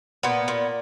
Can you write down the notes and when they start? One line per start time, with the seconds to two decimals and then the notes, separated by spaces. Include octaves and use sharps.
0.23 A#2 B3
0.48 A#2